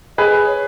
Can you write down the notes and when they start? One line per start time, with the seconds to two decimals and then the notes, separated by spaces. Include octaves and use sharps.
0.18 G#4 B4 D#5
0.47 C#5